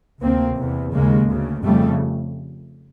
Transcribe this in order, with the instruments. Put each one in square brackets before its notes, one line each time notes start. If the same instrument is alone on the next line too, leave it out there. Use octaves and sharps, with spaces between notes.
[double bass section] D2 C3 A#3 C4
E2 C3
D#2 C#3 G#3 A#3
D2 C#3
F2 C#3 G3 A3